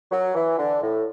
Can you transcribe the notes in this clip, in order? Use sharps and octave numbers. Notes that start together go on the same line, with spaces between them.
F#3
E3
D3
A2